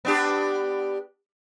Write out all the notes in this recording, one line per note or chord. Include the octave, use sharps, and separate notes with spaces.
B3 D4 G4